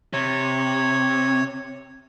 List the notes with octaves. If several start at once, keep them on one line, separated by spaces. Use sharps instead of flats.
C3 C#5